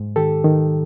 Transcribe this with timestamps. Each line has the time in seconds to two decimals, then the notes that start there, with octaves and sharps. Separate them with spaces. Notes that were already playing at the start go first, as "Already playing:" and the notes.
Already playing: G#2
0.16 D#3 G4 A4
0.44 D#3